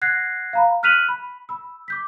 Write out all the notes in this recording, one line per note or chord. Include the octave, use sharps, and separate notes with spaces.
F#5 F#6 G#6 A#6 C7
F5 A#5 B5
F6 F#6 B6 D#7 F7 F#7
B5
B5 E6
D6 G6 B6